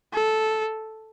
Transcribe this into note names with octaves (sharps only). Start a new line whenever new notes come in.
A4